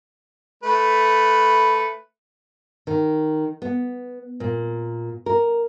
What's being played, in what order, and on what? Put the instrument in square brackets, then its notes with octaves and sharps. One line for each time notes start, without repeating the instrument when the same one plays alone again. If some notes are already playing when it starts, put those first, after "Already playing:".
[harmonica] A3 B4
[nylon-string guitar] D#3
B3
A#2
A#4